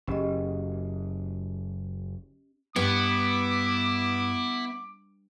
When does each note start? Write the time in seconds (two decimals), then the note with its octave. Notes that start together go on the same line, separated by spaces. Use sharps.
0.08 F#1 C#4 G4 D#5
2.76 G2 B3 E4 D6